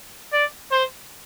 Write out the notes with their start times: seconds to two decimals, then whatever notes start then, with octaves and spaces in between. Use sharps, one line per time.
0.33 D5
0.72 C5